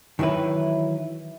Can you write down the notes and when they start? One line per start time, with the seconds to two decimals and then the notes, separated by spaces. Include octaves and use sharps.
0.19 D#3 E3 F#3 E4 B4